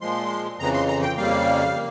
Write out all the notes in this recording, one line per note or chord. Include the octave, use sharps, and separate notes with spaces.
A#2 F3 G#3 C6
F2 C#3 E3 A#5
C6
A#5
G5
F2 C#3 G3 A#3 F5
A#3